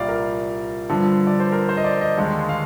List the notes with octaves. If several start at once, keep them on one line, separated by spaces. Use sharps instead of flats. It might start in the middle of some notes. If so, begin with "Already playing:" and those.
Already playing: C2 A#2 G3 D5 F5
A#4
G2 D3 F3
D5
C5
A#4
C5
D#5
D5
D#5
D#2 D3 G#3
F5